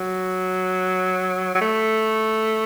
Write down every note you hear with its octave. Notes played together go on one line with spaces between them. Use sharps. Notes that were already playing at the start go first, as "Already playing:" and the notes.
Already playing: F#3
F#3
A3